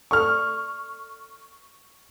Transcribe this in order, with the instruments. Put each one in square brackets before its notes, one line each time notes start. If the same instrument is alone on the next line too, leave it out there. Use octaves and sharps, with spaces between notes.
[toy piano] A4 D5 G#5 [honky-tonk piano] C#6 F6